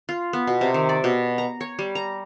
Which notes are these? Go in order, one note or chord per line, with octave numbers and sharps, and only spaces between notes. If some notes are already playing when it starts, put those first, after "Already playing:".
F4
B3
B2
C3
D#3
D5
B2
A#5
C#5
G3
A#5